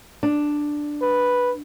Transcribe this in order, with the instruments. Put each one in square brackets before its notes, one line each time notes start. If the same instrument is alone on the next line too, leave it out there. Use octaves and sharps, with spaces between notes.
[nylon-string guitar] D4
[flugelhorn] B4